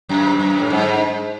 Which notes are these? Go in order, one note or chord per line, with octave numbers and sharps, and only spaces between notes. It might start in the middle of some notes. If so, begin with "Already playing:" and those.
F#2
F#2
A2
G#2